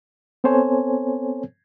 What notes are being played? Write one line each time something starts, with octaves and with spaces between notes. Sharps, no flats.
B3 C4 A4 C5 C#5 G#5